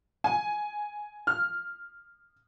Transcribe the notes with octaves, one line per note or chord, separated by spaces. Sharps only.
G#5
F6